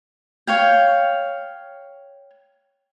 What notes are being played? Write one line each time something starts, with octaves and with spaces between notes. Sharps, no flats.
C#5 F5 G5